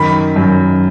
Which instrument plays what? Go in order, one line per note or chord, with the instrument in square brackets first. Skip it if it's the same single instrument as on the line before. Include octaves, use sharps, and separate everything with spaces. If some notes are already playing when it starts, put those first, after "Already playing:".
Already playing: [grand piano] F#2 D#3 B5
F#2